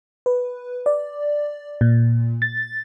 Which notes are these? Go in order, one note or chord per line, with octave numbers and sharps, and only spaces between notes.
B4
D5
A#2
A6